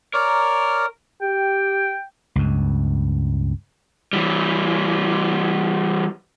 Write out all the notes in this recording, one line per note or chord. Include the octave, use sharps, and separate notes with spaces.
A#4 C#5 D5
G4 G5
C#2 G2
E3 G3